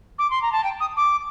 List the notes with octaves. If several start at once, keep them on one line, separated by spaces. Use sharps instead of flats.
D6
C6
A#5
A5
G5
D#6
D6